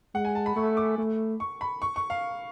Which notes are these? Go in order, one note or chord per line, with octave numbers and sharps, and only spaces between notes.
G#3 F#5
G#5
A5
B5
A3 C#6
D6
A3
C#6
B5
C#6
C#6
F5